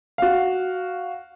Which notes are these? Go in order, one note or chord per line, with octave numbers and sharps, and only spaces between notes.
F#4 F5